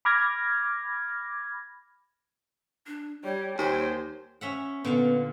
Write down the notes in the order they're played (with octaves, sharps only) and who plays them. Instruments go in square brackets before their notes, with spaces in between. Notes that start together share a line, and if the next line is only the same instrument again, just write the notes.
[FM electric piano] B5 D6 F6 G#6 A#6
[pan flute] D4
[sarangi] G3 [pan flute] C#5
[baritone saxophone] D#2 [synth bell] D#4 [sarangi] C5
[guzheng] C#4 E5 F#5
[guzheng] A#2 D3 F5 [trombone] B3